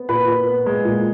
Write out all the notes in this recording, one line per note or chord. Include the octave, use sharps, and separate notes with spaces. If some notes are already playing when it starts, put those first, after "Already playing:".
Already playing: B3
A#2 B4 B5
A#2
B3
G#3
A#2